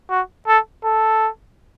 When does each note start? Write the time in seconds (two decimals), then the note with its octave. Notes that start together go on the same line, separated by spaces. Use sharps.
0.10 F#4
0.47 A4
0.84 A4